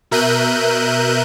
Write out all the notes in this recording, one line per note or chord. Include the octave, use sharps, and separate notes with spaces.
B2 A#4 E5 F#6 G6 D#7